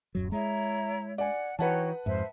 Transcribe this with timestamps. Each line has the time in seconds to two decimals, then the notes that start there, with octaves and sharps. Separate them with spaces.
0.15 D1 F#2 F#3
0.32 G#3 E4 C#5 E5 A#5
1.18 D5 F#5 G#5
1.59 E3 D#4 F#4 B4 C#5 F#5 G5 A5
2.06 F2 G#2 C5 E5